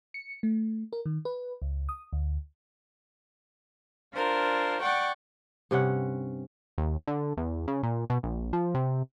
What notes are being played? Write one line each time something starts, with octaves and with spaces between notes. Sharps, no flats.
C#7
A3
A#4
D#3
B4
C#2
D#6
D2
D4 F4 A#4 C5
D5 F#5 G5 C#6
G2 C3 C#4 F#5
D#2
D3
E2
C#3
A#2
B2
A#1
F3
C3